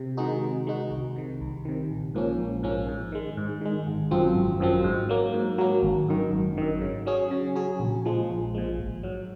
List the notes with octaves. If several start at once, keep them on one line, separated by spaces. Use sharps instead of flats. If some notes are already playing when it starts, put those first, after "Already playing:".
Already playing: C3
D#3 G#3 D#4 F#4
C3
D#3 G#3 D#4 F#4
C2
C3 D#3
C2
C3 D#3
A#1
G#2 F3 A#3 C#4
A#1
G#2 F3 A#3 C#4
G#2
D#3 G#3
G#2
D#3 G#3
G#1
F#2 F3 C4
G#1
F#2 F3 C4
G#2
F#3 A#3
G#2
F#3 A#3
G#1
F#2 D#3
G#1
F#2 D#3
C#3
F#3 C#4 G#4
C#3
F#3 C#4 G#4
A#1
A#2 F3 G#3
A#1
A#2 F3 G#3
G#1
G#2 F#3